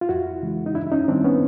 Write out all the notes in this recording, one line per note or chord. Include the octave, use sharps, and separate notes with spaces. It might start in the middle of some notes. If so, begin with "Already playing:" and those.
F4
F2 E4 F#4
C#3 E3 G#3
D#4
G2 D4 E4
E4
C#4 D#4
D#3 G3 C4 D4
B3 C#4